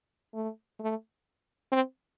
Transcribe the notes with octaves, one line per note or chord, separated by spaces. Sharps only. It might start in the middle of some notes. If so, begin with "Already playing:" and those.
A3
A3
C4